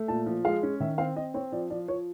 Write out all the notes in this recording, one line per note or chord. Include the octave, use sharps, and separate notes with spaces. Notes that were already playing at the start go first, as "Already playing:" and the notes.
Already playing: A3
A#2 A5
F3
G#3 F5
C#4
D#3 E5
C4 F5
C4 D#5
C4 C#5
F3 D5
F3 D5
F3 C#5